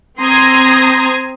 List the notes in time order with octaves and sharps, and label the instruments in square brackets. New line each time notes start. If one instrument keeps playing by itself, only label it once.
[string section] C4 A#5 C6 D#6 G#6